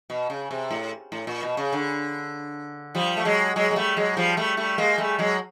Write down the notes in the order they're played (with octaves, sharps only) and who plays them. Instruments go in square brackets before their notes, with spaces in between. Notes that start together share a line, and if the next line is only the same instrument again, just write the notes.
[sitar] B2
C#3
C3
A2
A2
A#2
B2
C#3
D3
F3 G3
A3
F#3 G#3
F#3 G#3
G#3
G3 A3
F#3 G#3
F3 G3
G3 A3
G3 A3
G#3 A#3
G3 A3
F#3 G#3